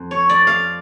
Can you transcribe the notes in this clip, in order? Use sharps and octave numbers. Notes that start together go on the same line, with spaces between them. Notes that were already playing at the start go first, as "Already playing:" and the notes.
Already playing: F2
C#5
D5
F5